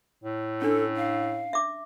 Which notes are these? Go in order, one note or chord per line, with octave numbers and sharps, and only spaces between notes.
A2
C#4 D4 A4
F5
E5 D6